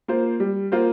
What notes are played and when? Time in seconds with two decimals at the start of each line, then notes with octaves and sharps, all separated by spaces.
0.08 A#3 F4 C5
0.40 G3
0.72 A#3 F4 C5